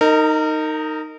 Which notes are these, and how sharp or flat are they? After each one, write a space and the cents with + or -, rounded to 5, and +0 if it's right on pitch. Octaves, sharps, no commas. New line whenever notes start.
D#4 +0 A#4 -30